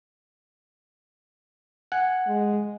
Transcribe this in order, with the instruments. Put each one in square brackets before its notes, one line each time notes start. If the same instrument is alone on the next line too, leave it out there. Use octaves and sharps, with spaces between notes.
[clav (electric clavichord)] F#5 G#5
[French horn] G#3